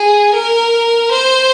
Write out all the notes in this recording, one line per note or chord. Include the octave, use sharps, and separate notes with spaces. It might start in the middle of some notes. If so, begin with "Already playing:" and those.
Already playing: G#4
A#4
C5